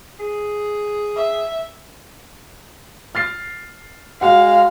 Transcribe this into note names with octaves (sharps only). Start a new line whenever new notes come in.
G#4
E5
F6 A6 C7
G#3 F#4 F5 F#5